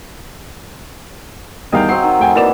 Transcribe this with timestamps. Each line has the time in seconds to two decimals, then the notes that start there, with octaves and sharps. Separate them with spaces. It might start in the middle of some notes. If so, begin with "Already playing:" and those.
1.72 E2 D#3 G3 D#5 F5 G5
1.89 F#3 C4 C7
2.04 D#3
2.20 F1 G5 G#5
2.35 E3 A#3 D5 E7